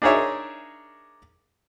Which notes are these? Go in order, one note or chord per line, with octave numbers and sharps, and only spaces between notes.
D4 D#4 G#4 A#4 C#5 E5